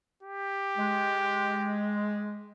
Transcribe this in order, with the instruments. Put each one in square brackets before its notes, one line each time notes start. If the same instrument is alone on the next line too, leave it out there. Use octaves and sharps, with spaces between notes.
[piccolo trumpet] G4
[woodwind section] G#3